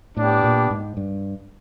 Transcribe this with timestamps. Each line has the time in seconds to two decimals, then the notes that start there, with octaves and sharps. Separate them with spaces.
0.17 A2 B3 D4 G4
0.44 A#2
0.71 G#2
0.97 G2